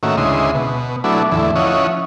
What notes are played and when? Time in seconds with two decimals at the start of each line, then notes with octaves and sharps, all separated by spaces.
0.03 A2 D#3 A#3 C#4 F#4 E5
0.17 D2 C#3 G#3 E4 D#5 C6
0.55 B2
1.04 F#3 A3 B3 D4 E4
1.32 E2 A2 D3 E3
1.55 F3 C#4 E4 C#5 D#5 F#5